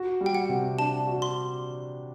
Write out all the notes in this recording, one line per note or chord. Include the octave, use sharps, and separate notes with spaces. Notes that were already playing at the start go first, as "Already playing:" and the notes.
Already playing: F#4
G3
G5
F#5
C3
D4 A5
F#4
C6